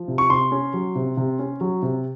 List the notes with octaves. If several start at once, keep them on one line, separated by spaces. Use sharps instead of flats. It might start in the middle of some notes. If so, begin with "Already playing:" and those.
Already playing: F3
C3
C#6
C3 C6
C#4
F#3
C3
C3
C#4
F#3
C3